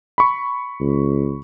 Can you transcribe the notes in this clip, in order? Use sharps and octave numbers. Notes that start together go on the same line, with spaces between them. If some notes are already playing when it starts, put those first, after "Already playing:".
B5 C#6
C#2